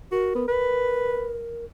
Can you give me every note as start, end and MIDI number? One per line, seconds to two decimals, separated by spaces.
0.12 0.31 66
0.12 0.48 70
0.35 0.44 59
0.48 1.65 70
0.48 1.37 71